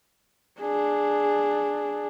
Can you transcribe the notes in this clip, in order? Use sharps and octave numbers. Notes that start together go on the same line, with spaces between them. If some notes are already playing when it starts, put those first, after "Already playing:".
D4 G#4